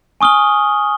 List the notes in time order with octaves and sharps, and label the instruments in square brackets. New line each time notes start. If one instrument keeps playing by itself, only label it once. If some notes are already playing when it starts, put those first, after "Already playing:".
[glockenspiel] G#5 C#6 D#6 F6 G7